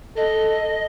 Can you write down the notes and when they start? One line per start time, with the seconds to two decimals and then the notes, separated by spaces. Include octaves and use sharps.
0.17 A4 D#5